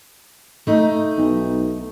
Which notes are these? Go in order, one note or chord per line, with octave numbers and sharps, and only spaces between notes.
A3 D#4
B1